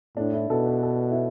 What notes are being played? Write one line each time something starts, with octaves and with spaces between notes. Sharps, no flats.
A2 D4
E4
B2 A4
B4
A4
E4